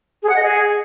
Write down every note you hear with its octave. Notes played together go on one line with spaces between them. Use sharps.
G#4
F#5
D#5
G#4